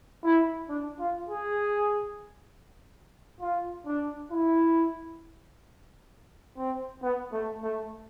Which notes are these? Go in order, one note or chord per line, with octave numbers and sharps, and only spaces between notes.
E4
D4
F4
G#4
F4
D4
E4
C4
B3
A3
A3